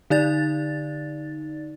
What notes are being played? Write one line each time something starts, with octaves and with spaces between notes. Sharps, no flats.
D3 D#4 D5 A6